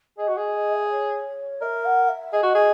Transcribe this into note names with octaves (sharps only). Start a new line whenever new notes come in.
G#4 D#5
F#4
G#4 D#5
D#5
E5
C#5
A#4 E5
F#5
E5
G#4 D#5
F#4
G#4